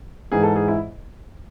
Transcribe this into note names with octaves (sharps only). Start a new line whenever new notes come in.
G#2 E3 G#4
A4
G#4
E4